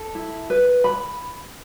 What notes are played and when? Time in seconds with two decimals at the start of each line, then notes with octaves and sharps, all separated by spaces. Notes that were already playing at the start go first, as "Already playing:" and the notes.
Already playing: A4
0.15 E4
0.50 B4
0.84 B5